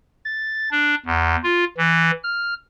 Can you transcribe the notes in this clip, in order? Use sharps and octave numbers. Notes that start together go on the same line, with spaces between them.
A6
D4
E2
F4
E3
F6